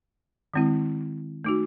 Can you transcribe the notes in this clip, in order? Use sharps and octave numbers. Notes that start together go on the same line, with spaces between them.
D#3 G#3 C4 E4
A3 D#4 F#4